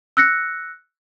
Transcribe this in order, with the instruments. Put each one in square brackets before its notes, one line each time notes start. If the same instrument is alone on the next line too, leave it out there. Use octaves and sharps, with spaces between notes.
[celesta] E6 F#6 A#6 C#7